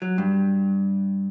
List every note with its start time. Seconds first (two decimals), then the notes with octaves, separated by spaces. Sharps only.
0.02 F#3
0.18 G2